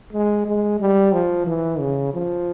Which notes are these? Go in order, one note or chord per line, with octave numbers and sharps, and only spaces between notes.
G#3
G#3
G3
F3
E3
C#3
F3